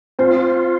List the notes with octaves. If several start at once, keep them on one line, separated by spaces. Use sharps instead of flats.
C4 F4 C5